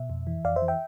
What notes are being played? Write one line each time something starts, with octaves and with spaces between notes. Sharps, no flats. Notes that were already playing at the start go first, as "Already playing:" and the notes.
Already playing: B2 E5
F2
E3
F2 D5 F5
C5 E5
E3
E5 G5